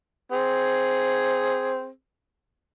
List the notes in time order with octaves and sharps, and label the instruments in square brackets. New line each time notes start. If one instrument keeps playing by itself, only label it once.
[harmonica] C4 G#4